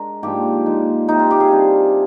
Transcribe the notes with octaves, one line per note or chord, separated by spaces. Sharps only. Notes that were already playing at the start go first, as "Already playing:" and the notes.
Already playing: G#3 D4 A#4 A#5
G#2 F3 A#3 D4 G4
A#2 G#3 D#4
C3 G3 C4 D#4
F4
G4
G#4
C3 G3 D4